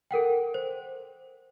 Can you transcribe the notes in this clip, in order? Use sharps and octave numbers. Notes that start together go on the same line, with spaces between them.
A4 A#4 F#5 G5
C5